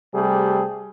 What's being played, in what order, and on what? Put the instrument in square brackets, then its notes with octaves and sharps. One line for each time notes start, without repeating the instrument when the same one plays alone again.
[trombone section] C3 G3 A3 G#4